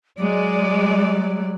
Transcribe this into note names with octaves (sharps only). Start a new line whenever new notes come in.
F#3 G#3 D5